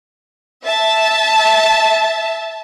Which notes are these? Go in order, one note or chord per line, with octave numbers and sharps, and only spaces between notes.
E5 A5